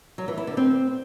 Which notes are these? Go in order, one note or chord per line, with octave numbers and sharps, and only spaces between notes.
F#3
E3
E4
D3
C4